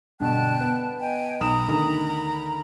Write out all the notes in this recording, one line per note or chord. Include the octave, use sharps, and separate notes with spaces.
G2 B2 D3 G5 A5 F#6
B3
D#5 G5 G#5
B1 A#5 B5 D#6 E7
D2 D#3 D#6